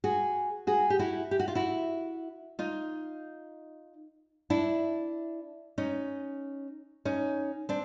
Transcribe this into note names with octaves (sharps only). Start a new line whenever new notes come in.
F#4 G#4
F#4 G#4
G4
E4 F#4
G4
F#4
F4
E4 F#4
D#4 F4
D4 E4
C#4 D#4
C#4 D#4
C4 D4